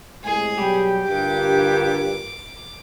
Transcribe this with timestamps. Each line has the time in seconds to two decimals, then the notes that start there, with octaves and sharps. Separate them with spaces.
0.24 A2 C3 G#3 G#4
0.58 B2 F#3 G3 G4
1.08 G2 D3 F4 A#4 D6